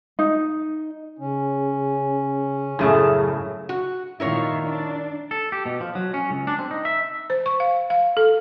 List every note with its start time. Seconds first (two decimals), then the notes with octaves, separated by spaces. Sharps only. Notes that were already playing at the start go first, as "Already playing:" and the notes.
0.19 D#4
1.19 C#3 C#4
2.79 F#2 A2 C#3 A3 G#4
3.69 F#4
4.20 A#2 D#3 E4 F4 A#4 C#5
4.66 D4
5.31 A4
5.52 G4
5.66 B2
5.81 F3
5.95 F#3
6.14 C#4
6.31 C#2
6.47 D4
6.59 C4
6.71 D#4
6.85 E5
7.30 C5
7.46 C#6
7.60 F5
7.90 F5
8.17 A4